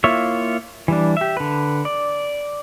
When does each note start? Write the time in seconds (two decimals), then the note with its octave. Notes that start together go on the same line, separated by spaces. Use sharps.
0.04 A#3 E4 F4 C#5 E5
0.88 E3 G3 D4
1.17 G4 E5
1.37 D3 B4
1.85 D5